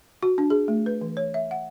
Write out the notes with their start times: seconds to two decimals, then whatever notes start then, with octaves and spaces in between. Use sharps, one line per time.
0.23 F#4
0.38 D4
0.50 G#4
0.68 A3
0.86 B4
1.01 E3
1.17 C#5
1.34 E5
1.51 F#5